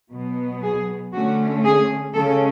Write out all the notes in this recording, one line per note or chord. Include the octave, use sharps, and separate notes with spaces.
B2 F#3 B3
G#4
D3 A3 C#4 F#4
G#4
C#3 G#3 C#4 A4